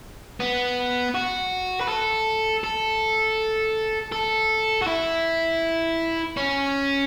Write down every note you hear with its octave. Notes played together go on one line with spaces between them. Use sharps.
B3
F#4
B4
A4
A4
A4
F#4
E4
C#4